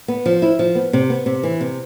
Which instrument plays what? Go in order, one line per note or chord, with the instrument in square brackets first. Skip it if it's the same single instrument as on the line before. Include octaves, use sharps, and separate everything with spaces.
[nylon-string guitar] B3
F3
E4
F3
B3
C3
B3
C3
E3
C3